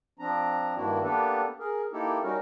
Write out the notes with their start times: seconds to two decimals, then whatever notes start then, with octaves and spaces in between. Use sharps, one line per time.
0.19 F3 C4 D4 A#5
0.76 G2 D#3 A#3 D4 E4 F#4
1.03 A#3 B3 D4 G4 A4 B4
1.60 G#4 A#4
1.93 A#3 D#4 E4 G4 A4
2.23 G3 C#4 D#4 F#4 A#4